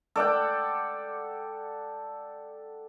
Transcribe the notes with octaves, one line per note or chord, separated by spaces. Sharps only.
A4 D5 F#5 G5